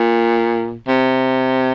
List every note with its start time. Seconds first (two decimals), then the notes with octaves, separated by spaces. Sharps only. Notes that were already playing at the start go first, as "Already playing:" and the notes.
Already playing: A#2
0.88 C3